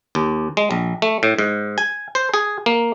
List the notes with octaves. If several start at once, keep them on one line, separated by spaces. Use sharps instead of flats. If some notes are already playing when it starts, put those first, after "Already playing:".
D#2
G#3
A#1
A3
A2
G#2
G#5
C5
G#4
A#3